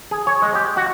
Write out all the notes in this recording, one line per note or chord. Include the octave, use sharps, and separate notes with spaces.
G#4
C#5
G#3
G4
F#4